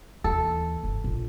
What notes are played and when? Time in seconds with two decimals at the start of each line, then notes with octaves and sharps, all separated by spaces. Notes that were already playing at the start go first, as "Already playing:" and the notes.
0.24 D#2 E3 A4
0.84 G1
1.04 A#1